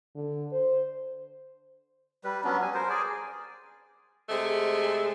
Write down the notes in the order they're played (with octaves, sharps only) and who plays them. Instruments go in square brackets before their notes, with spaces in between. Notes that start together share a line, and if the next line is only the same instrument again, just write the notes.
[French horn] D3
C5
[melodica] G3 B4
F#3 B3 C#4 D4
G3 G#5
A#4 C5
G#4 D5 G#5
[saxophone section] C3 G#3 A3